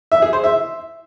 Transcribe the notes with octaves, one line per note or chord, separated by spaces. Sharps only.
E5
G#4
C5
E5